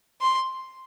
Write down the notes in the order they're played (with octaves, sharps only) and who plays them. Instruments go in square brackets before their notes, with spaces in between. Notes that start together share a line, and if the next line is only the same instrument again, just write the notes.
[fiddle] C6